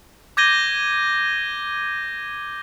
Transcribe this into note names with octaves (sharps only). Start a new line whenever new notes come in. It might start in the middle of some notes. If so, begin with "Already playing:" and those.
D6 G6 G#6 A#6 D#7 G7